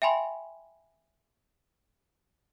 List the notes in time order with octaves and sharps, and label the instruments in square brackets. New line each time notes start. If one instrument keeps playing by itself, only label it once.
[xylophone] E5 G5 G#5 B5 C6